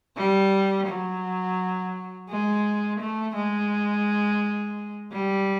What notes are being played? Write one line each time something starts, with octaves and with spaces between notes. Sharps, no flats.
G3
F#3
G#3
A3
G#3
G3